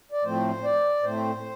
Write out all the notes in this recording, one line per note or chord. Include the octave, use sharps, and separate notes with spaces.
D5
A2 F3 A3 C4 C5
D5
A2 A3 C4 C5